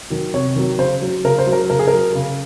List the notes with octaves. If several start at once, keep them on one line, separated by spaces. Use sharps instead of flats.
D#3 F#3
C3 C#5
D#3 F#3
C#3 C5
F#3
C#3 A#4
C5
F#3
A#4
C#3 A#4
G#4
A#4
F#3
C#3